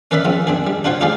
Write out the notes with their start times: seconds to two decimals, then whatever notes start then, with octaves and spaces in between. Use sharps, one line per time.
0.11 C#4 A#4 B4 D5 E5 B5
0.25 F3 G#3 C4 C#4
0.47 C4 D4 G#4
0.67 G3
0.84 D4 F4 F#4 C5 C#5
1.01 D#4 F4 G4 G#4 D5 F5